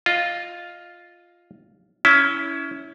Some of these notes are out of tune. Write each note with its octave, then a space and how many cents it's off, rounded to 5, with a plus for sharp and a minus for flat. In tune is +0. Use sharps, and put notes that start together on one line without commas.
F4 +0 D#5 -5
C#4 +20 E4 -10